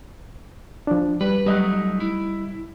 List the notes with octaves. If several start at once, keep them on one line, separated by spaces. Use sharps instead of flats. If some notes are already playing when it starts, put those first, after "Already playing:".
F3 D4
G3 B4
F#3 G3 A3 D#4 D#5 F#6
E4